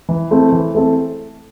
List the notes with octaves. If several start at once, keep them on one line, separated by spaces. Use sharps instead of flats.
E3
A3 C4 E4 A4
E3
A3 C4 E4 A4